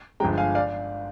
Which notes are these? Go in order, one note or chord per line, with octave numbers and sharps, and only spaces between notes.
G1 G2 F3 G#3 G5 A#5
F5 G#5
D5 F5